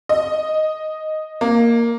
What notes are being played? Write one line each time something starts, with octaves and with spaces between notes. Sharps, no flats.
D#5
A#3